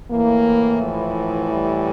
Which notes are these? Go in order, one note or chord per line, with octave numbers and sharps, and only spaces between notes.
A2 E3 A#3
F3
G3